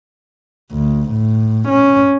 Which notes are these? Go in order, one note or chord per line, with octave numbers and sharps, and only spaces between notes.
D2
A2
C#4